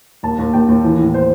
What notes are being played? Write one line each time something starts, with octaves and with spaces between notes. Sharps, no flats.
D#2 A5
D#2
D#2 G5
D#2
E3
A2
B3 C5